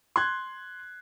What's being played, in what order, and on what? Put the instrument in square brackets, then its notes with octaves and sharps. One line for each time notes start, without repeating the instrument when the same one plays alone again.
[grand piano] C6 F#6 G#6